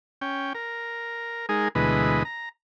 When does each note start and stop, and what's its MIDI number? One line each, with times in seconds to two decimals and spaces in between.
0.21 0.53 61
0.21 0.53 79
0.55 1.46 70
1.49 1.68 56
1.49 1.68 63
1.49 1.68 68
1.49 1.68 70
1.75 2.23 38
1.75 2.23 47
1.75 2.23 52
1.75 2.23 56
1.75 2.23 71
1.75 2.23 75
2.25 2.49 82